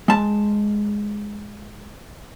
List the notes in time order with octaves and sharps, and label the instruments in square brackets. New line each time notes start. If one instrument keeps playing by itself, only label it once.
[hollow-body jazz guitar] G#3 A5